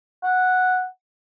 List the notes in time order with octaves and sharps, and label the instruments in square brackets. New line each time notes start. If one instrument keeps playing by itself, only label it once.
[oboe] F#5